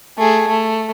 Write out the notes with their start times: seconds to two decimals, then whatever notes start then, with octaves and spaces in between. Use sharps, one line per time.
0.18 A3 G#4
0.48 A3